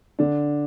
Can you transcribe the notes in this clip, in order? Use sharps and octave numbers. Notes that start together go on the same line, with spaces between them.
D3 D4